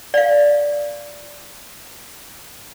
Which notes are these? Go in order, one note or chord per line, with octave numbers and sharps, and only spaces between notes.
D5 F5